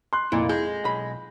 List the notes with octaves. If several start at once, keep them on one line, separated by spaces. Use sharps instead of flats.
C6 F#6
F1 A#2 E4
G#3 G6
B1 B5